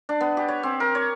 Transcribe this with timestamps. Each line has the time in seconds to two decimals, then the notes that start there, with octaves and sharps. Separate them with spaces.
0.09 D4
0.21 B3
0.37 G4
0.48 C#5
0.63 C4
0.80 A#4
0.95 C#5